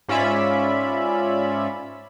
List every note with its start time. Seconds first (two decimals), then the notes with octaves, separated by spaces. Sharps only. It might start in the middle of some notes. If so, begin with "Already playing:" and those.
0.08 G#2 C#4 F4 D5 E5 B5